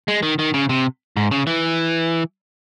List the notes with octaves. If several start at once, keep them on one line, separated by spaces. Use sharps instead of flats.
G#3
D#3
D#3
C#3
C3
G#2
C#3
E3